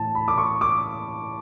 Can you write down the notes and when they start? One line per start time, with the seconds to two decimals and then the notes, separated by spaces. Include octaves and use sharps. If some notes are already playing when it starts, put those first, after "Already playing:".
Already playing: A2 E3 A5
0.15 B5
0.28 D6
0.38 C#6
0.61 D6